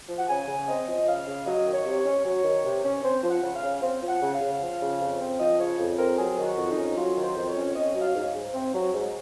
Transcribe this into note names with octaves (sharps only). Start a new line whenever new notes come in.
F3
F#5
C#3 G#5
C#3
C4 D#5
F3
C#3 F5
C#3
F#3 D#5
D#3
C#5
C3
C#5
C#4
F#3
D#3
C3
C#4
C4 C5
F3
F#5
C#3
F5
C#3
C4
F3
F#5
C#3
F5
C#3
F3
C#3
F2
C4
F3 D#5
C#3 C#5
F2
C4 A#4
F#3 G#4
D#3
F#4
F2
D#4
C#4
F#3 F4
D#3
C5
F2
C#5
C#4
C4 D#5
F#3
F5
G#2
G#2
C4
F#3
G#2